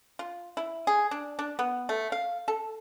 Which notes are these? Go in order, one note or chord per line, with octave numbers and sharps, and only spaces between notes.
F4
E4
G#4
D4
D4
B3
A3
F5
A4